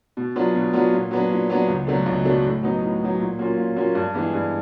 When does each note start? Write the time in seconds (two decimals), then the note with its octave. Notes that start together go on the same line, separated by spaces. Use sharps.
0.17 B2
0.36 F#3 B3 D4 F4
0.55 B2
0.73 F#3 B3 D4 F4
0.93 A#2
1.11 F#3 B3 D4
1.31 A#2
1.50 F#3 B3 D4
1.68 C#2
1.87 B2 F#3 A3 D4
2.06 C#2
2.25 B2 F#3 A3 D4
2.44 A2
2.63 F#3 B3 D#4
2.81 A2
3.01 F#3 B3 D#4
3.20 A#2
3.38 F#3 A#3 C#4 F4
3.57 A#2
3.76 F#3 A#3 C#4 F4
3.95 G2
4.14 E3 G#3 B3 D4
4.34 G2